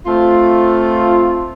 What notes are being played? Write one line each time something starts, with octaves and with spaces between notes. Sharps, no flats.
A3 C4 F4